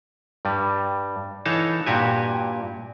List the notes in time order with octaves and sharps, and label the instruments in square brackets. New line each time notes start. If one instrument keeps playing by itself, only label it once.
[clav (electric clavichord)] G2 G3
E3 D#4 A4 C#5 F5 A5
G2 A#2 F#4 G4 G#5